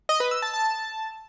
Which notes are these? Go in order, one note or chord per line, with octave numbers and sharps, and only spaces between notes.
D#5
B4
E6
A5
A5